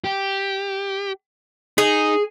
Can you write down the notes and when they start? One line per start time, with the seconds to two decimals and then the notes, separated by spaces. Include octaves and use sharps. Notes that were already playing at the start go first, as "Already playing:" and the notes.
0.04 G4
1.78 D#4 G#4